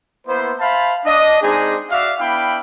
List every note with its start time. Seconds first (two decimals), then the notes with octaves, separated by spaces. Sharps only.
0.26 A#3 B3 E4 C5
0.59 C5 E5 F5 A5 B5
1.04 D4 D#5
1.42 G#3 C4 D4 D#4 G#4
1.90 F#4 D5 E5 F5
2.19 B3 D4 E4 F5 G5 B5